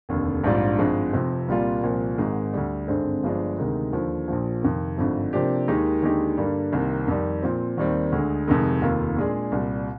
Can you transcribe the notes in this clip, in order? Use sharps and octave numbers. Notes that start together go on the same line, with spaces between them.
F1 D#2 D3
A#1 G#2 G3 D4 F4
G#1 G2 F3 G#3
F1 F2 C3 F3
C2 A#2 G3 A#3 F4
C2 A#2 F3
G#1 G#2 D#3 G#3
D2 D3 G3
G#1 G2 D3 G#3 C4
G1 G2 F3 G#3 D4
D2 C3 D#3 G#3 D#4
D#2 D3 F3
A#1 A#2 F3
F2 C3 D#3
G#1 G2 D3 F3
C3 F3 A#3 D4 G4
D#2 D#3 G#3 D#4 G4
D#2 D3 G#3 D#4 G4
G2 D3 G3 A#3
C2 C3 D#3 A#3
F2 D#3 G3
A#2 F3 C4
D#2 D#3 G3 C4
D2 D3 G#3
F1 F2 C3 D#3 G#3
F1 D#2 D#3 A#3 F4
A#2 G#3 D4 G#4
C2 A#2 G3